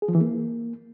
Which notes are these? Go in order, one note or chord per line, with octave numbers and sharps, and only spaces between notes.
G#4
F3
E3
A#3